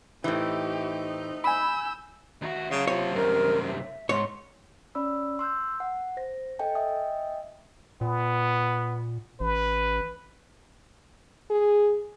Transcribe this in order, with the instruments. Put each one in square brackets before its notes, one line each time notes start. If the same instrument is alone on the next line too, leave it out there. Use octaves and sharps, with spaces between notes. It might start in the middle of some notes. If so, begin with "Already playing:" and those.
[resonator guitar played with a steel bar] A2 E3 [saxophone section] A3 C4 D#4 [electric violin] G4
[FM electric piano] G#5 B5 [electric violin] E6 G6
[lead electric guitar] D#2 F#4 [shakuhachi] E5
[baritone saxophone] C#3 [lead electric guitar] F#3 F5
[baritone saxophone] C3 [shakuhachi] F4 [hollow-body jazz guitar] C#5
[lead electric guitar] C2 F#2 [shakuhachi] A#4
[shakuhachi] E5
[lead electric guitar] G#2 [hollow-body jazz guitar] C#5 [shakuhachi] C6
[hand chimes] C#4 D5 B5 E6
C6 E6 F#6 G6
F#5
C5 A#6
A4 D#5 G5 G#5
D#5 E5 G5 G#5 D#6
[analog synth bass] A#2 [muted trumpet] B3
[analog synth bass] A1 [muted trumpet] B4
[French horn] G#4